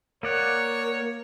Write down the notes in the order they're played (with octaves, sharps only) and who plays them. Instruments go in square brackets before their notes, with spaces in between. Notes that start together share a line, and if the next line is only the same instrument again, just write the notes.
[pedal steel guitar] A#3 D5 F#5 [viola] A#4 [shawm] C#5